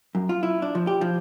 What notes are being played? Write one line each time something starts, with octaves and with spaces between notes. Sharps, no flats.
F#2
F4
E4
D4
F3
G4
F3